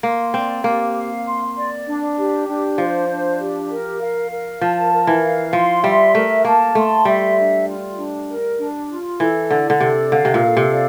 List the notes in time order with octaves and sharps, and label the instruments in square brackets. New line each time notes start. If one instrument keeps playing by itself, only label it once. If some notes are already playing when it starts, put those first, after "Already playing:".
[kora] A#3 [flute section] C6
[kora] C4 [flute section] D5
[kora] A#3 [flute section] G4
[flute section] F5
C6
D5
D4
G4
D4
[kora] F3 [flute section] C5
[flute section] D4
G4
A#4
F5
A#4
[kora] F3 [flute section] A5
[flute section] A#4
[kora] E3
[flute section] F5
[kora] F3 [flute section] C6
[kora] G3 [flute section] E5
[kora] A3 [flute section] A#4
[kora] A#3 [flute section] A5
[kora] A3 [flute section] C6
[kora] G3 [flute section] E5
[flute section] D4
F4
D4
A#4
D4
F4
[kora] E3 [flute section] A4
[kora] D3 [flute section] D5
[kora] D3
[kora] C3 [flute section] A4
[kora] D3 [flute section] F5
[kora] C3
A#2
[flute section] A4
[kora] C3
[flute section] D5